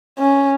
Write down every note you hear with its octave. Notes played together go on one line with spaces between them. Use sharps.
C#4